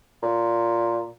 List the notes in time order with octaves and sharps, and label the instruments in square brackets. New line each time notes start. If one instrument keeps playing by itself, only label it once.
[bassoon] A#2